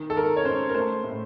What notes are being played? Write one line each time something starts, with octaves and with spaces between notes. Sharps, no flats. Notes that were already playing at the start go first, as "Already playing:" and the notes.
Already playing: D#3
A4
D#3 A#4
C#5
C#4 C5
A#4
A3 C5
A2